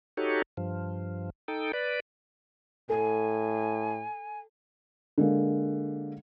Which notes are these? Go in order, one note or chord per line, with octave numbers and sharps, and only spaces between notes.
D#4 F#4 G4 A4 C#5
G2 F3
D#4 A4 G5
B4 D5
A2 A4 G#5
D3 G#3 A#3